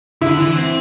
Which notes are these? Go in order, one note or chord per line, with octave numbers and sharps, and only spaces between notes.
D3 E4
E3
C4